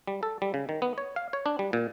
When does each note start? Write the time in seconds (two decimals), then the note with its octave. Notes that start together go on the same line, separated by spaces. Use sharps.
0.07 G3
0.23 A4
0.42 G3
0.54 C#3
0.69 D#3
0.82 B3
0.98 C#5
1.16 F5
1.33 C#5
1.46 D4
1.59 G3
1.73 A#2